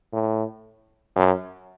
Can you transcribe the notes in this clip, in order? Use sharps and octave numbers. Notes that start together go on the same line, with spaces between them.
A2
F#2